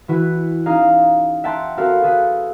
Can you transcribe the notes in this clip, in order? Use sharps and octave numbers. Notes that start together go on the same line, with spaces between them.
E3 E4 F#4 B4
C#4 D#4 G#4 F5 A#5
E5 F#5 G5 A5 A#5 C6
C4 F#4 A4 A#4 F5 B5
F#4 G#4 A4 B4